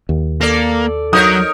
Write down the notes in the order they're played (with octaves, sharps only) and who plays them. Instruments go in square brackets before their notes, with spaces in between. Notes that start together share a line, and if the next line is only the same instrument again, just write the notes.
[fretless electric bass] D#2
[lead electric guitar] A#3 [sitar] A4 D5
[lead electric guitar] F#3 [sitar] D#4 A#4 C#5 [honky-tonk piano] D#6